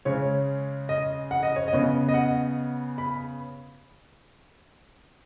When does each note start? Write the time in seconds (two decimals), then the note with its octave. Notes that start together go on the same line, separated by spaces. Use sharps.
0.05 C#3 G#3 C#4 C#5
0.89 D#5
1.31 F#5
1.43 D#5
1.56 C#5
1.68 D#5
1.73 C#3 B3
2.09 D#5
2.14 F#5
2.98 B5